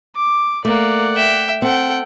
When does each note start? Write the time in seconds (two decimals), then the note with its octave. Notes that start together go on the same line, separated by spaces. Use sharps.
0.16 D6
0.65 A3 A#3 D5 F#5
1.15 E5 G5
1.62 C4 A4 F#5 G5